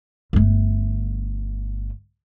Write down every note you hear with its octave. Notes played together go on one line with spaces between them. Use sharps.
G1 A3